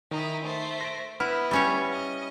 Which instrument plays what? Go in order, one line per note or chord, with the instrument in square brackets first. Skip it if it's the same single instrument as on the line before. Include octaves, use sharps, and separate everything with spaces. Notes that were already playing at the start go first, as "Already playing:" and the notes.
[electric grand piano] D#3 [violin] D#4 E4
[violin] A3 C5
[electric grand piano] A#6 D7
[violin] B3 [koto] E4 [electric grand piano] B4 F#5 F6
[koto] G3 C#4 C#5
[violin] D#5